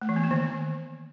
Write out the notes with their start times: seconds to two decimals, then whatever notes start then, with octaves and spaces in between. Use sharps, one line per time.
0.01 A3
0.09 E3
0.16 B3
0.24 A#3
0.31 D#3